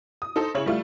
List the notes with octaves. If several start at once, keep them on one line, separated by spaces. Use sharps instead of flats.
D#6
D#4 A4 C5
C#3 E4 C#5 F#7
G3 A3 F4